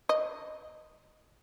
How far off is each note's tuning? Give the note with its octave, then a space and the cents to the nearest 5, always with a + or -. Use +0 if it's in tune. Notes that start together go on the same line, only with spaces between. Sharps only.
D#5 -5